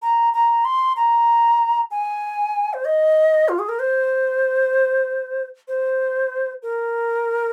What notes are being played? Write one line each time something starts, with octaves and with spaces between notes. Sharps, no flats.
A#5
A#5
C6
A#5
G#5
C5
D#5
F4
G#4
A#4
C5
C5
A#4